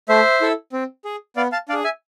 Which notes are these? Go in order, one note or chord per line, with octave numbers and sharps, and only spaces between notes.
A3 C5 E5
E4 A4
C4
G#4
B3 D5 F5
F5 A5
D4 G#4 D5 F5
E5 G#5